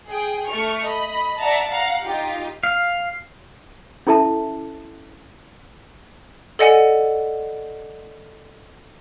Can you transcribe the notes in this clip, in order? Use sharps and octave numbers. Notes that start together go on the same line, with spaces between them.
G#4 G5
A3 C#6 F6
D#5 B5
D5 E5 F#5 A5 A#5
F5 F#5 A#5
D#4 F4 G4
F5
C#4 E4 A4 E5 A5
A4 D5 D#5 F#5 G#5